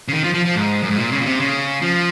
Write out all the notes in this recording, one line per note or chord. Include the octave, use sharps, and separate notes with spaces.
C#3
D#3
F3
F3
F3
G#2
F#2
G#2
A#2
C#3
A#2
C3
C#3
F3